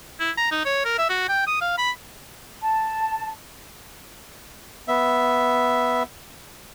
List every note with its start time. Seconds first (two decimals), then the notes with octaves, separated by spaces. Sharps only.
0.20 E4
0.37 A#5
0.51 D#4
0.65 C#5
0.85 A#4
0.98 E5
1.09 F#4
1.28 G5
1.47 D#6
1.61 F5
1.78 B5
2.61 A5
4.88 B3 E5